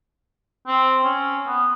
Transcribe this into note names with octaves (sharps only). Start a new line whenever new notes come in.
C4
C#4
B3